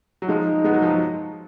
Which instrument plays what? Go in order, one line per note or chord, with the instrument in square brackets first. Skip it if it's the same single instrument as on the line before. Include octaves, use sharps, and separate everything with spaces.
[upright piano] F#3
[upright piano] F3 G#3 [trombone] D#4
[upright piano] G#3 B3
F#3
F3
F#3